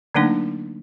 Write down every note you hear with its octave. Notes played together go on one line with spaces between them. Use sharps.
D3 F#3 A3 A#3 D4 D#4